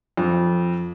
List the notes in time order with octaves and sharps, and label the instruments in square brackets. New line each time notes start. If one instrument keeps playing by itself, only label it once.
[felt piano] F2